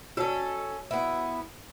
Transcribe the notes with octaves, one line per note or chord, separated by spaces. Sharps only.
C#4 F#4 A4 C#5
B3 E4